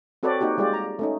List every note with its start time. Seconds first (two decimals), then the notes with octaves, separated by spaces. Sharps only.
0.23 C4 F#4 A4 B4 C#5 D5
0.41 A#3 D#4 F#4 G4
0.57 G3 G#3 F4 G4 D5
0.73 A#5
0.99 A3 C#4 D#4